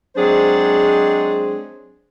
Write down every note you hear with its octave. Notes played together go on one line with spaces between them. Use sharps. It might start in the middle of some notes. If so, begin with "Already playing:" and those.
F#3 G#3 C4 D4 G#4 C5